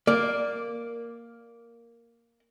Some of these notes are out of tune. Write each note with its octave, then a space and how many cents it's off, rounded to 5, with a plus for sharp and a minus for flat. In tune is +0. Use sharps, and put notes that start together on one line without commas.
A#3 +0 D5 +5